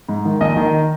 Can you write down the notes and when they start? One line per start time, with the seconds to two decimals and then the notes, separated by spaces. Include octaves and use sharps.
0.09 G#2
0.25 D#3
0.41 A#1 D#5
0.57 D#3